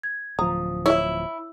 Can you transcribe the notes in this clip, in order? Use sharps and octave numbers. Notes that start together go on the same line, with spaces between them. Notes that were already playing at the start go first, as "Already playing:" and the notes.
G#6
D1 F3 A#5 D#6
E4 C#5 D5 E5 E6